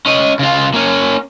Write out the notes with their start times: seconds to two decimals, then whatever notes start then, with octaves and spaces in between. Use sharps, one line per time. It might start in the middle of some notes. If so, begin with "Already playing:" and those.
0.06 C#4 D#5
0.39 C#3 F4
0.74 A#3 C#4